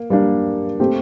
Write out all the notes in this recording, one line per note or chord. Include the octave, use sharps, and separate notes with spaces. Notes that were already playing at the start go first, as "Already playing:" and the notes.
Already playing: A#3
G3 A#3 D4
A3 C4 G4